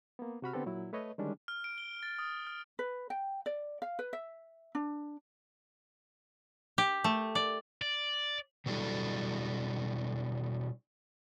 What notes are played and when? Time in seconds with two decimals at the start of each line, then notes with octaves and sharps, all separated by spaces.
0.19 A#3 B3
0.42 C3 F#4 B5 F6
0.53 D3 B3 C4 G4 A4
0.66 A#2 F#3 E4
0.93 A3 B4 C#5 D#5
1.18 D3 D#3 G3 G#3 C#4 D4
1.48 F6
1.64 D7
1.78 G7
2.03 A6
2.19 D#6
2.47 F6
2.79 B4
3.10 G5
3.46 D5
3.82 F5
3.99 B4
4.13 E5
4.75 D4
6.78 G4
7.04 A3
7.35 D5
7.82 D5
8.66 B2 F#3 G3 D4 E4 A4